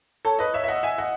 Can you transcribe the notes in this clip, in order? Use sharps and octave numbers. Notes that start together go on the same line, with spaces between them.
A4 C#5
B4 D#5
C#5 E5
E5
D#5 F#5
E5 G#5
D#5 F#5